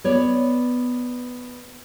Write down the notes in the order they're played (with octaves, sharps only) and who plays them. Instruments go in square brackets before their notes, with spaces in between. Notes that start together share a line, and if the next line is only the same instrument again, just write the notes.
[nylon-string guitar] B3 C#5 D5